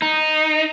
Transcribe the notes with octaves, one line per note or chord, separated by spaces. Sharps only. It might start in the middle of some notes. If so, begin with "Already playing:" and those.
D#4